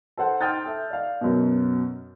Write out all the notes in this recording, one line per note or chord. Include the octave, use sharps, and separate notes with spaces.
A4 C5 F#5
G5 C6 D#6 F6 G6 A6
A4 E5
D5 F5
F#2 B2